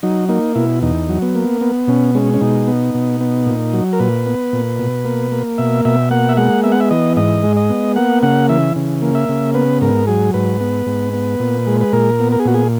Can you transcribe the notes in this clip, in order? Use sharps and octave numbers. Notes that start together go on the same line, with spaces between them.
F#3 D#4
A#3 D#4
B2 E4
E2 D#4
F#3
B3
A#3
B3
B2 C#4
G#3 C#4
C#4
B2 D#4
B3
B2
B3
A#2
F#3
A#4
A#2 B4
B3
A#2
B2
A#3
A#3
B2 E5
B2 E5
A#3 F#5
E5
G#3 F#5
B3 E5
F#5
E5
E3 D#5
G#2 D#5
G#3
D#5
B3
A#3 F#5
C#3 F#5
E3 E5
C#3
A#3
E5
C#3
B3 B4
G#2 A#4
F#3 G#4
G#2 B4
B3
G#2
B3
A#2
G#3
B4
A#2 A#4
B3
A#4
G#4
A#2 F#4
G#4